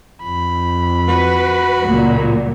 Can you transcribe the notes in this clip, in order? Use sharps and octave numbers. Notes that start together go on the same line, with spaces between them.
F2 B5
F#4 B4
C#2 A#2 F#3